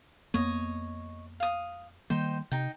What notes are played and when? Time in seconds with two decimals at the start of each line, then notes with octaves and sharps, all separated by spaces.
0.34 F2 A#3 B3 C#5 D#5
1.40 F5 D#6
2.10 D#3 G3 A#3 D#4 C5 G5
2.52 C3 D#4 G5